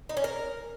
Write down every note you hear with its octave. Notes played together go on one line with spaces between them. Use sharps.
D#4
C#4
A#4